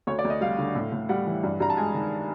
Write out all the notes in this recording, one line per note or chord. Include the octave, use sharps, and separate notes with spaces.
D2 C#5
D5
D2
D#5
G3 F5
D3
A2
A2
G3 F#5
E3
G2
G2 A#5
A5
G#3 G#5
D#3